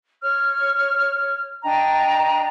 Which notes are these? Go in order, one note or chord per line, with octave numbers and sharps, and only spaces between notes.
C#5 F6
D4 D#5 G5 A#5